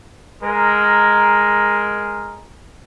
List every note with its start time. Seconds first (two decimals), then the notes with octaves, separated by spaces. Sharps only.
0.43 G#3 A#4